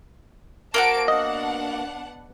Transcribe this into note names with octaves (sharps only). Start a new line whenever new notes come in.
A#3 F4 F#4 C5 A5 D7
B3 D4 D#5 F#5